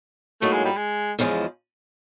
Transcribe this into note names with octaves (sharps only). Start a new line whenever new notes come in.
A2 F#3 A3 A#3 D#4
G#3
G3
G#3
E2 C#3 F3 G#3